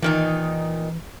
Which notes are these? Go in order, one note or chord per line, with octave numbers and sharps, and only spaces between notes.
A#2 D#3 E3 D#4